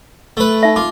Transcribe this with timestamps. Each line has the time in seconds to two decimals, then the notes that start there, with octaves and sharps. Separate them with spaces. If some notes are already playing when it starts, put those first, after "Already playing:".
0.37 A3 B4
0.63 D#4 E5
0.76 F4 D6